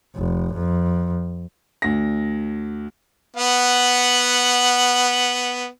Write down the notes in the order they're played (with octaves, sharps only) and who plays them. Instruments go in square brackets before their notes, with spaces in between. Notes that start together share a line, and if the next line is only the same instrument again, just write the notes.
[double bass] F1
F2
[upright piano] D2 A#6
[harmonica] B3 F#5